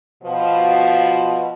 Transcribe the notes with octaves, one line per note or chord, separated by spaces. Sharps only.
B2 F3